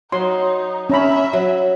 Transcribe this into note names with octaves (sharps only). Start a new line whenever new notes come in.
F#3 D#4 C6
C#4 E5 A#5 B5
F#3